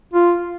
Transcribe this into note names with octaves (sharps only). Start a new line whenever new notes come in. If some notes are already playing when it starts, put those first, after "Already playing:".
F4